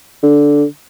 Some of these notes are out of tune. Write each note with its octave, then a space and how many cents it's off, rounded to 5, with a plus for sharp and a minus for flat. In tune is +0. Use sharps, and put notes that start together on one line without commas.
D3 -10